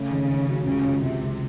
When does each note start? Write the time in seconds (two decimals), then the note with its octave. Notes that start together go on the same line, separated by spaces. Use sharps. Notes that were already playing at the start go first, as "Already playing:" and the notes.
Already playing: C#3 A3 C#4
0.11 D#3
0.30 D#3
0.48 F#3
0.66 C#2 C#3
0.85 C#2
1.03 C#2 C3
1.21 C#2